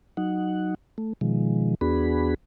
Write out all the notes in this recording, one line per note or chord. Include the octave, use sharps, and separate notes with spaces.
F#3 D#4 F#5
A3
B2 D#3 F3 G#3
E2 B3 D4 F#4 G#4 B5